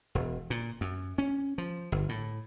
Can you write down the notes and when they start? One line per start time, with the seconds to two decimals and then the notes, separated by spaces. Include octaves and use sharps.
0.15 E1
0.50 A#2
0.81 F#2
1.18 C#4
1.58 F3
1.92 G1
2.09 A2